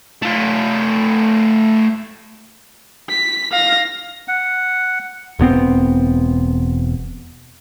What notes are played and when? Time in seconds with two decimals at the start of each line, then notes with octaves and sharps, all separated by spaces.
0.22 A3 F4
3.10 B6
3.52 F5 A#6
4.28 F#5
5.39 E1 G2 B3 C4